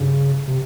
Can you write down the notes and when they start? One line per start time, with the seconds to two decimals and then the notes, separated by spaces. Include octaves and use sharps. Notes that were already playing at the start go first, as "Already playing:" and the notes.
Already playing: G2 C#3
0.48 C3